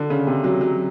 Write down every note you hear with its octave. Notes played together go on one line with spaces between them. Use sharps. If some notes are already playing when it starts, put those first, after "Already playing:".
Already playing: D3
C#3
C3
F#3
F#3